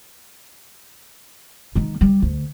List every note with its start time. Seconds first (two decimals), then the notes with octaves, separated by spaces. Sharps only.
1.75 D#3 G#3
2.01 G3
2.22 D2